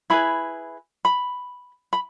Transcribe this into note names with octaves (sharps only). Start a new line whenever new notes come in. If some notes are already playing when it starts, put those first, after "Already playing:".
E4 G#4 B4 B5
B5
B5